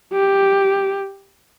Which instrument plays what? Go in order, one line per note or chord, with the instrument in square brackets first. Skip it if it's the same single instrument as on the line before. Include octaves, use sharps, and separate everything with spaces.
[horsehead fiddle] G4